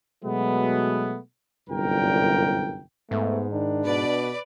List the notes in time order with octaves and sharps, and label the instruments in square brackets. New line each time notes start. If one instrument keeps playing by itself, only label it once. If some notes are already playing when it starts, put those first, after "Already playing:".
[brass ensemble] B2 F#3 G#3 A3 B3
G1 C2 F#2 A#2 A#4 G5
[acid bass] G#2 [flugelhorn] A3 [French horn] B3
[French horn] D#3 [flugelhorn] D4
[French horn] B2 [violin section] B4 D5